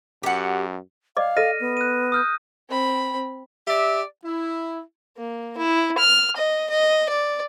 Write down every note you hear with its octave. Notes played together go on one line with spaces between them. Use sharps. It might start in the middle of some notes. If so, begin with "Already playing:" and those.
F#2 G4 F#5
D5 D#5 F5 D6
A4 D#5 F6 A#6 D#7
B3
F#6 D#7
D#6 F6 G6
C4 B5
G4 D5 E5
E4
A#3
E4
F6
D#5
D#5
D5